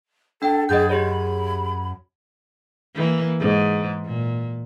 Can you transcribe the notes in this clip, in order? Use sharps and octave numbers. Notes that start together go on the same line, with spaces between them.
D4 A4 G5
F#2 G#4 D#5 G6 A6 D7
G4 G#4 C#5 B5
E3 A#3
G#2
A#2